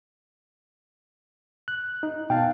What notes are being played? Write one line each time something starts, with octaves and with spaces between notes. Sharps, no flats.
F#6
D#4
B2 F5 G5 A5